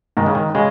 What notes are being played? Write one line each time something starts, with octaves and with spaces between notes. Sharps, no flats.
G#2 D#3
C#3
D#3
C#3 G#3